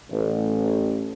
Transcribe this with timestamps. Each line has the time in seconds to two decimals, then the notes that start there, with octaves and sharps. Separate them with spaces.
0.10 A1